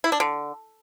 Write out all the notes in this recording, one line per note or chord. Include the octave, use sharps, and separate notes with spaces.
E4
D4
D3